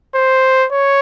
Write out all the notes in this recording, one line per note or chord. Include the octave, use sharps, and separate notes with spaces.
C5
C#5